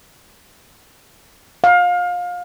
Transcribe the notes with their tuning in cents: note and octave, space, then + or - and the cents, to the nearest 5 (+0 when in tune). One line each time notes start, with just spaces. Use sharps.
F5 +25